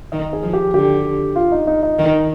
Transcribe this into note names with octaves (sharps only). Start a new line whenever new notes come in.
D#3 D#5
G#4
F3
G4
D3 G4
F4
D#4
D#4
D#4
D#3